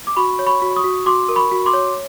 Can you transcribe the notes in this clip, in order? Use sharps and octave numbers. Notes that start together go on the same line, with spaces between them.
D6
F#4 B5 C#6
C#5
B5 C#6
F#4
C#6 D#6
F#4
F#4 C6 D6
A#4
B5 C#6
F#4
C6 D6
C#5